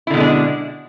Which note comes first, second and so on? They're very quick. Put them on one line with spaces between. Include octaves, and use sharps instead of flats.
E4 D3 B2 G#3 D4